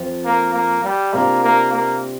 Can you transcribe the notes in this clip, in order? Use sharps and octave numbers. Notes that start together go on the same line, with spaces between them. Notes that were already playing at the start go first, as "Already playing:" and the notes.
Already playing: F2 F3 C4
A#3
A#3
G3
C3 G3 A#3 D4 F4
A#3
A#3